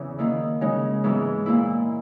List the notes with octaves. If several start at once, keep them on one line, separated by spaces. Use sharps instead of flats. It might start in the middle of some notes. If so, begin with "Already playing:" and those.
Already playing: E2 C#3 E3
D#3 A#3 E4
C#3 G#3 D#4
G#2 E3 G#3 B3
A#2 A#3 E4